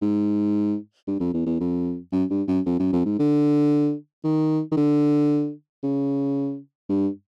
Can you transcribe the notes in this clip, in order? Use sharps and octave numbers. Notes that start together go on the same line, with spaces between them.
G#2
G2
F2
E2
E2
F2
F#2
G2
F#2
F2
F#2
F2
G#2
D3
D#3
D#3
D3
C#3
G2